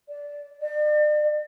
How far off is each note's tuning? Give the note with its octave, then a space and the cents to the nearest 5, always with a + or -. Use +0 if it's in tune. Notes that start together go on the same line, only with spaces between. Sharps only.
D5 -15
D5 +40